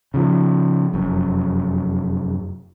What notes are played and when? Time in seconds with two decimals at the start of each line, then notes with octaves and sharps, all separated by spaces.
0.14 C#3 F3
0.93 F1 F#2